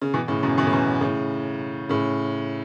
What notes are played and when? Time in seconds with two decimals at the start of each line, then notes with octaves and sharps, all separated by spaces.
0.02 C#3
0.14 B2 E3
0.28 A2 C#3
0.43 F#2 B2
0.58 B2 E3
0.67 A2
0.73 F#2 B2
1.01 A2 C#3
1.89 A2 C#3